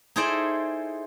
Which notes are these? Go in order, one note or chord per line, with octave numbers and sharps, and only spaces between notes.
D#4 E4 G#4 A4 C5 D5